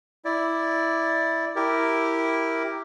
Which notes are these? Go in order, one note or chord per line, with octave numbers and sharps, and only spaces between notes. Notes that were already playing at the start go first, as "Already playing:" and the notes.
E4 D5
E4 G4 A#4